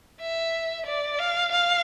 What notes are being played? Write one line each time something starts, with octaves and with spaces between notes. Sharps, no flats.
E5
D5
F5
F5